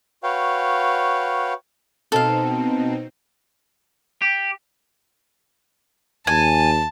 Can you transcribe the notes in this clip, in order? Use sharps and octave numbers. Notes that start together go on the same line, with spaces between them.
F#4 B4 C#5 F5 G5
B2 C4 D#4 A4 F5
G4
D#2 G#5 A5